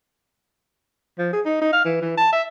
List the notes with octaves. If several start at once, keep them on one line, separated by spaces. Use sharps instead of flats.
F3
G#4
D#4
D#4
F5
E3
E3
A5
E5